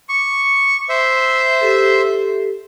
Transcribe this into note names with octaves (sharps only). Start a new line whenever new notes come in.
C#6 D6
C5 E5
G4 A4